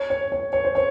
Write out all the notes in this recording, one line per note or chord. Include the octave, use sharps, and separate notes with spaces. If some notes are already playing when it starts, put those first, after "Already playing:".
Already playing: C#5
C#5
C#5
C#5
C5
C#5